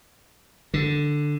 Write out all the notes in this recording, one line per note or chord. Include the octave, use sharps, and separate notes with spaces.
D3